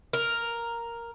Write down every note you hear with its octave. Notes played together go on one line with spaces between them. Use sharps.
A#4